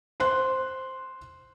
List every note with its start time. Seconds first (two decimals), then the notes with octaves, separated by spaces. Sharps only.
0.20 C5 C6 F#6